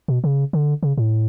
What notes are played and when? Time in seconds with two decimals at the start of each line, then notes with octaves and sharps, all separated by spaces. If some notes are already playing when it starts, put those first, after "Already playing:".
0.08 B2
0.24 C#3
0.53 D3
0.83 C#3
0.98 A2